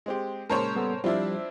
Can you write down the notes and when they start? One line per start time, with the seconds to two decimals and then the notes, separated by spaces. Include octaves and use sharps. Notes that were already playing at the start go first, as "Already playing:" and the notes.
0.06 G#3 C4 G4
0.50 A#2 C#3 G#3 A#4 C5 C#5 A5
0.75 G3 B3 A4
1.04 F3 G3 C4 D4 E4 F4